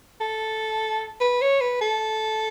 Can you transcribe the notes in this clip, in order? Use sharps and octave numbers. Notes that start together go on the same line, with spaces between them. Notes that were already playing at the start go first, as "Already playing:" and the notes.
A4
B4
C#5
B4
A4